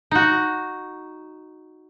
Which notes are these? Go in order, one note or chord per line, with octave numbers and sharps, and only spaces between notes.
D#4 F#4